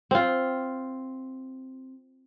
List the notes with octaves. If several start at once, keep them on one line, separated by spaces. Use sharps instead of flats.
C4 F4